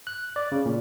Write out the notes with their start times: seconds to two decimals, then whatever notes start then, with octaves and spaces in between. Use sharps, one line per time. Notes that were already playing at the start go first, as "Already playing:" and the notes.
0.07 F#6
0.36 D5
0.52 C#3
0.66 A#2